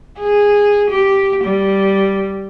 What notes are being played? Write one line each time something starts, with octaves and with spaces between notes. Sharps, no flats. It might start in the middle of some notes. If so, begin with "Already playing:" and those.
G#4
G4
G3